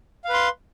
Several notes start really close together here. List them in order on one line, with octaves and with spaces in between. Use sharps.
F5 B4 C6